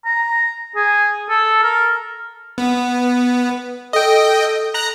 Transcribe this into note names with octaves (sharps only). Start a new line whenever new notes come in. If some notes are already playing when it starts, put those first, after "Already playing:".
A#5
G#4
A4
A#4
B3
A4 D#5 G5
A#5 F#6 A#6